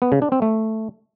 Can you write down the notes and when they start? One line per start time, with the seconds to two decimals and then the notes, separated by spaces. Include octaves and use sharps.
0.02 B3
0.12 C#3
0.22 D4
0.32 C4
0.42 A3